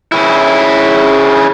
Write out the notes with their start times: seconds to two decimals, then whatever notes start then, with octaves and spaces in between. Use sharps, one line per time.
0.12 C#3 E4